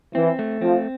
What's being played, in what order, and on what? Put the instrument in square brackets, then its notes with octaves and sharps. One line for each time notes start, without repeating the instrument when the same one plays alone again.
[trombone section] E3 [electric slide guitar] C4
[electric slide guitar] A3
[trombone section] F3 [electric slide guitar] C4